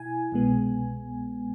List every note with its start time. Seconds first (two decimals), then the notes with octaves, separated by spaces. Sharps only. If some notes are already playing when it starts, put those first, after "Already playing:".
Already playing: B2 E4 G#5
0.32 C2 B2 G#3 B3